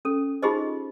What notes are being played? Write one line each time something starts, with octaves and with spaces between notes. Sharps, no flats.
C#4 A4
D#4 F4 G4 G#4 C5 D#5